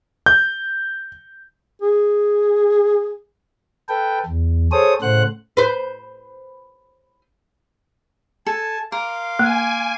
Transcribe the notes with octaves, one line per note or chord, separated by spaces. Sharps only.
G6
G#4
A4 B4 G5
E2
G#4 A4 C5 C#5 D#6
A2 C#3 A3 C5 F#5 F#6
B4 C5
A4 G#5 A5
A#4 F5 C6 D6
A#3 G#5